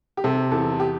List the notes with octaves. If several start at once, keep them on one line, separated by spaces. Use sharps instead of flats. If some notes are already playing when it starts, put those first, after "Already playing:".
G4
C3 A4
E2 A4
G4